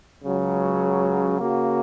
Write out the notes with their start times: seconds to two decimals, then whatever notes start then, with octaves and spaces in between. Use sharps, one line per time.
0.24 C#2 C#3 F#3
1.39 C#3 A#3 F#4